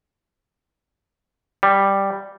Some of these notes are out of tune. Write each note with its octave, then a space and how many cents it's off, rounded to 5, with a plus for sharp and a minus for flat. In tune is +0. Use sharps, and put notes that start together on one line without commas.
G3 +0